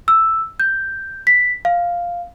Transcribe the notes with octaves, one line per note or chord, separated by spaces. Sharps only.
E6
G6
B6
F5